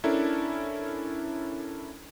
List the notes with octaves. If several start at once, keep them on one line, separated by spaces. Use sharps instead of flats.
C#4 D4 E4 A4 A#4